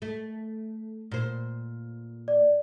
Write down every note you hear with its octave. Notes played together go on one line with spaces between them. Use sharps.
A3
A#2 C5
D5